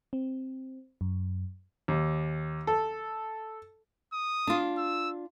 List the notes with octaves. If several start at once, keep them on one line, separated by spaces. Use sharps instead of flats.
C4
F#2
D#2
A4
D#6
D4 F4
E6